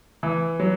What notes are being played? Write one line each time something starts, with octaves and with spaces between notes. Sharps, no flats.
E3
F#3